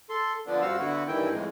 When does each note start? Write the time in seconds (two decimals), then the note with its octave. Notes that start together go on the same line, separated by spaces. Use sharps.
0.10 A4 C6
0.47 D3 F3 B3 D4
0.61 F#2 G3 C4 F#4 F5 E6
0.79 D3 B3 E4 F#4
1.08 G2 D#3 E3 E4 G5
1.30 F2 A2 G#3